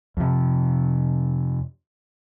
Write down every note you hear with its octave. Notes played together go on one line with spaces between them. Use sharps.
F2 C3